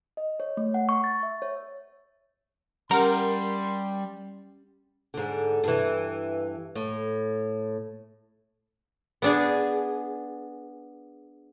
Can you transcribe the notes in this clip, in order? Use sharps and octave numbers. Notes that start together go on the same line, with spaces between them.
D#5
C#5
A3
F#5
C#6
A6
E5
C#5
G3 C#4 G4 A#4 F#5 C6
G#2 D3
G2 E3
A2
B3 D4 G#4